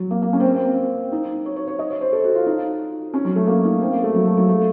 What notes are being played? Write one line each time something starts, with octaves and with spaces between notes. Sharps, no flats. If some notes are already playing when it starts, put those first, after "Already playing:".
Already playing: F#3
A#3
A#3
C#4
C4
A#3
C4
D#4
C#5
C#5
C#5
D#5
C#5
C5
A4
F#4
F4
D#4
C#4
F#3
A3
A#3
D#4
C4
A#3
A3
F#3
A3
F#3
A3